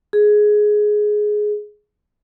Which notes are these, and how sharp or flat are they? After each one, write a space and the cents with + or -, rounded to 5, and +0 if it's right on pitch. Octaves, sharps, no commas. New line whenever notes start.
G#4 +10